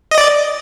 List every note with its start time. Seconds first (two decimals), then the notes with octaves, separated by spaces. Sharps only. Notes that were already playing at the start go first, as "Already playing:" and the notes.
0.11 D#5
0.18 D5